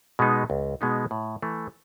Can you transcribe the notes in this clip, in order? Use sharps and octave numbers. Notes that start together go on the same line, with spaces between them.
B2 G#3 B3 D#4
C#2
B2 G#3 B3 D#4
A2
E3 A3